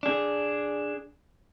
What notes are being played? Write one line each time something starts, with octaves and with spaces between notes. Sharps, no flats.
D4 G#4